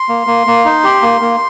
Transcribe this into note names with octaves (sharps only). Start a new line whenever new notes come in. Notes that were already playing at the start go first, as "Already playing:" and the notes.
Already playing: C6
A#3
A#3
A#3
D#4
G4
A#3
A#3